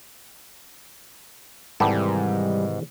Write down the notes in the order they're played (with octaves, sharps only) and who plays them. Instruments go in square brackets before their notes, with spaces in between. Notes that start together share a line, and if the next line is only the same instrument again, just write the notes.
[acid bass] G#2 [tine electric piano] C3 D#3 E3 [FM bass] G3 [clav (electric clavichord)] B3 G4 A4